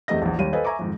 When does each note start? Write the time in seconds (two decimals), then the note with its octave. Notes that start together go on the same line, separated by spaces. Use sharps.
0.08 E2 A3 C4 G4 D#5 A#6
0.22 A#1 E2
0.39 D#2 G3 D#7
0.53 A4 B4 C5 D#5 F5 G#5
0.65 E5 G#5 A#5 C#6 D6
0.79 F2 G#2 D#3